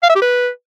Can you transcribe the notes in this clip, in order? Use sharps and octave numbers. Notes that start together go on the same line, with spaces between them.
F5
E5
G4
B4